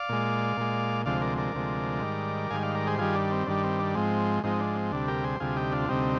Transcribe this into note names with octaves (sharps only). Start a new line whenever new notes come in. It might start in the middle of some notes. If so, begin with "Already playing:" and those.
Already playing: D5 F5
A#2 G#3
A#2 G#3
D2 C3 F3 G#3 D5 F5
A#4 D5
A#4 D5
D2 C3 F3 G#3
G#2 D#3 G3
G#2 D#3 G3 F5 G#5
D5 F5
A#4 D5
G#4 C5
G2 D#3 G3 F4 G#4
D4
C4
G2 D#3 G3 D4
C4
D4
G#2 F3 G#3 C4
G#2 F3 G#3 C4 D#4
D4
C4
D2 C3 G3 D4
G4 A#4
G#4 C5
D2 C3 G3 F4 G#4
D#4 G4
D4 F4
D2 C3 G3 C4 D#4